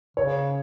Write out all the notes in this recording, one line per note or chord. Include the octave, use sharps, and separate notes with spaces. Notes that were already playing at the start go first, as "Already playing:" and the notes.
C#3 C#5